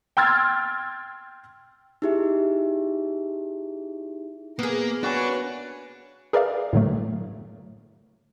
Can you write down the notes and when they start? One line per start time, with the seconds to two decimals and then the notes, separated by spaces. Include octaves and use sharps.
0.17 G5 C6 E6 F6 G#6 A6
2.02 D#4 E4 G4 G#4 E5
4.59 A#3 B3 G#4 A#4
5.03 D4 F#4 B4 C#5 G#5
6.33 G#4 A#4 B4 D5 E5 F5
6.73 A2 D3 F#3 A3